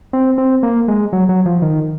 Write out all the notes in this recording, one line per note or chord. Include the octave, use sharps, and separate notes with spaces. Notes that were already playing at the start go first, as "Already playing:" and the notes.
C4
C4
A#3
G#3
F#3
F#3
F3
D#3